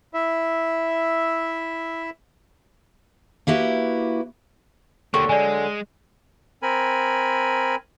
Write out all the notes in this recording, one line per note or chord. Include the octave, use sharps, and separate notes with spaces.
E4 E5
A#3 E4 F#4 G4 B4
D3 F#3 A#3 G4 C#6
G#3 D5 G#5
C4 A#4 G#5 B5